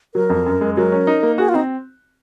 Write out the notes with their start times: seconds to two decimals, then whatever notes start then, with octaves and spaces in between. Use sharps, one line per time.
0.15 F#3 A#4
0.30 F2
0.46 F#2
0.61 G#3
0.77 F#3 A#4
0.92 C#4
1.07 D#4
1.23 A#3
1.38 F#4 G#4
1.49 F4
1.54 C4 D#4